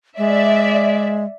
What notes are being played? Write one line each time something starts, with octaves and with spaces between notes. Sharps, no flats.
G#3 D5 E5